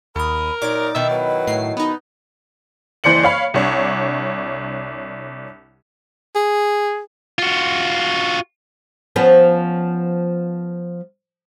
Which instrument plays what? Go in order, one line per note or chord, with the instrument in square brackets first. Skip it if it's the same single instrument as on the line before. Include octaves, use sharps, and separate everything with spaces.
[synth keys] D#2 D#6 [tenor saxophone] A#4 [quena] B5
[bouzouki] A#2 F#3 [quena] D#4 [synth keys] D6 A6
[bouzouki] B2 D#3 E4 [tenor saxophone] E5
[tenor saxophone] F#3 [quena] B4
[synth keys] A2 C7
[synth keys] B3 D#4 [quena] B5
[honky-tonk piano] F#1 E3 C5 D5 C#7 F#7
C#5 F5 B5
C2 D4 C#5
[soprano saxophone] G#4
[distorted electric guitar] F4 F#4
[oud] F3 B3 C#4